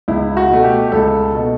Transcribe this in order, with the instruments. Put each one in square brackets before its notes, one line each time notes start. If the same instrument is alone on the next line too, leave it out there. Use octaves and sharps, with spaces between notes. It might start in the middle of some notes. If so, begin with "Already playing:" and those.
[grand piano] C#2 E4
F#4
B2 A3
G4
C#2 A4
B2 A3